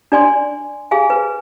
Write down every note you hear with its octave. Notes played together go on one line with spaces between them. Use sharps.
D4 D5 G#5 C6
G#4 F5 G#5
B4